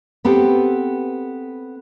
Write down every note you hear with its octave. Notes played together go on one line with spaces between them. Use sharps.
B3 C4 G4 A4